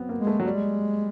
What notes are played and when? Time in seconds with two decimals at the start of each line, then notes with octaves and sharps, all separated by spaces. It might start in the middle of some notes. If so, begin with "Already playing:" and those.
Already playing: F#3 B3 C4
0.09 A#3
0.18 G#3
0.27 A3
0.40 F#3
0.45 G3 G#3